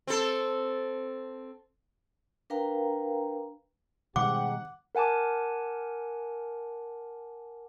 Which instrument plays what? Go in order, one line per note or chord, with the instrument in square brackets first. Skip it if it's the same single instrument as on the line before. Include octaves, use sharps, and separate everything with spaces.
[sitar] C4 A4
[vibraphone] D4 A#4 B4 F5 G5 A#5
[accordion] G#2 G4 [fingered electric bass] B2 D#3 G3 [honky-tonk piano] F#5 [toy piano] D6
[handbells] A#4 F#5 G#5 A5 D6